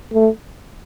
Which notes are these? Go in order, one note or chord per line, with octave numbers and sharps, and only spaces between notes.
A3